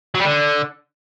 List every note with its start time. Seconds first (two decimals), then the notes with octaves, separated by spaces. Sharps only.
0.15 F#3
0.20 G3
0.25 D3